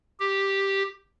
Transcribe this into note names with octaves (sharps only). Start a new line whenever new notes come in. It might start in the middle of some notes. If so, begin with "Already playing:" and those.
G4